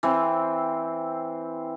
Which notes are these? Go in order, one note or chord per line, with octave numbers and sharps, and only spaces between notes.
E3 C4